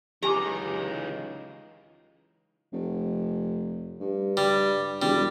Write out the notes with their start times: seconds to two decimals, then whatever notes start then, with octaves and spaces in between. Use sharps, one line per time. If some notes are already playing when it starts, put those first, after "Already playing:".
0.23 C#2 E3 D#4 G4 G#5 A#5 D6
2.73 F1
4.00 G2
4.37 G3
5.02 E1 G3